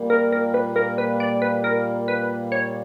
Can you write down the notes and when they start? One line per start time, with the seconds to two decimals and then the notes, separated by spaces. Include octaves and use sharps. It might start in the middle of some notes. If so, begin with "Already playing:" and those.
Already playing: A#2 G3 A#3
0.10 A#4
0.32 A#4
0.54 B4
0.76 A#4
0.98 B4
1.20 D5
1.42 B4
1.64 A#4
2.08 B4
2.52 C#5